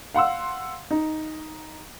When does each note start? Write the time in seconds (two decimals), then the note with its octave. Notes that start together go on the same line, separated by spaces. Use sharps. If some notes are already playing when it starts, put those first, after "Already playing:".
0.14 F5 F#5 C6 E6
0.91 D#4